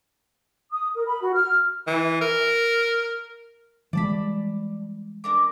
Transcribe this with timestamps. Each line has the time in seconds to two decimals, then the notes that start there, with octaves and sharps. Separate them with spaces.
0.71 D#6
0.95 A#4
1.07 B5
1.21 F#4
1.34 F6
1.87 E3
2.21 A#4
3.93 E3 G3 G#3 D5 A5 B5
5.24 D4 A#4 D6